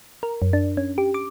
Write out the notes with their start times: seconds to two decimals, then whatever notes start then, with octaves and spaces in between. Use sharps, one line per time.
0.23 A#4
0.42 F#2
0.53 D4
0.77 C#4
0.98 G4
1.14 D6